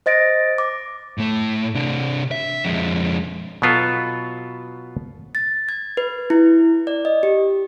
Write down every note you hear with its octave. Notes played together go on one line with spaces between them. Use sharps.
C5 D#5 A6 A#6 D7
D6
A2 A3
C3 D4
E5
F2 G#3
B2 F#3 B3 F4 A4
A6
G#6
B4
E4
D5
D#5
G4